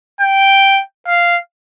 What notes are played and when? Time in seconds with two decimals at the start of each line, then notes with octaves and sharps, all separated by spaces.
0.21 G5
1.07 F5